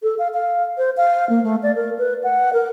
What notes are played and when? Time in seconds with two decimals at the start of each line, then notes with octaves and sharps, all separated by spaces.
0.03 A4
0.19 F5
0.34 F5
0.78 C5
0.97 F5
1.29 A#3
1.44 A3
1.63 D5
1.75 A#4
1.99 B4
2.23 F#5
2.53 A#4